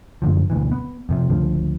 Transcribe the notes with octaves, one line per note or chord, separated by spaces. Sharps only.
F#2 A2 D3 F3
D2 B2 E3
B3
F2 C3 F3
C#2 A2 D3 F3